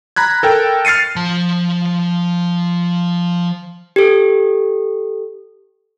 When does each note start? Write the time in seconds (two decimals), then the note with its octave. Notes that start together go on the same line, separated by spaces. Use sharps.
0.16 A#5 B5 F#6 G#6
0.43 A4 A#4 G5
0.85 F6 A6 C7 C#7 D#7
1.16 F3 A5
3.96 G4 A4